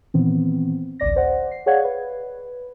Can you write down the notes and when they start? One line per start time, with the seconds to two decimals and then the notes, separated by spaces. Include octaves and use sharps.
0.14 A#2 D#3 E3 B3 C4
1.00 A1 D2 D5 A#6
1.16 C5 D5 F#5
1.51 C7
1.66 G#4 C#5 D5 F5 F#5 G#6
1.84 B4